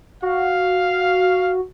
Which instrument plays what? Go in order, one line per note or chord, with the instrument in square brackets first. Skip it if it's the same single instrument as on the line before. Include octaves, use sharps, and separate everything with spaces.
[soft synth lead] F#4 [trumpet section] F5